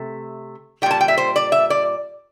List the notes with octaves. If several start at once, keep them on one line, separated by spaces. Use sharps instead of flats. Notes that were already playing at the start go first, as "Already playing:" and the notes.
Already playing: C3 A3
A#2 G3 G5 A5
G5
E5
C5
D5
E5
D5